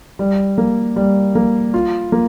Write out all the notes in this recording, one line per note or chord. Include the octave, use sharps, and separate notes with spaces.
G3
A#3
G3
A#3
F4
A#3